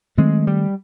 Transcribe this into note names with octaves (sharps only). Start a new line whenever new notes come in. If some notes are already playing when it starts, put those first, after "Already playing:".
D#3 F#3 G#3 A3 C4
G3